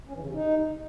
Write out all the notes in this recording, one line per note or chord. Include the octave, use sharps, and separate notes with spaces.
C#4
E3
C#3
C3
D#4